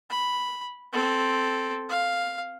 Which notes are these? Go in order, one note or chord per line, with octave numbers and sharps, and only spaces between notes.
B5
C4 A4
F5